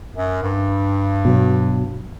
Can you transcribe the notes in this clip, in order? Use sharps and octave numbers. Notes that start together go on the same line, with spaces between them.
F#2
G2
B2 F#3 B3